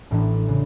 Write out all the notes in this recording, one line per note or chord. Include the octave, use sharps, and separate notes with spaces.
A1 A2 E3 B3 D4
C#3 E3 B3